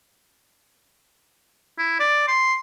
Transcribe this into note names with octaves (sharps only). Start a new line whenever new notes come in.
E4
D5
C6